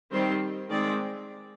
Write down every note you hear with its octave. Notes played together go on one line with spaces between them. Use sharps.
D#3 G3 C4 C5
D#3 G#3 C4 D5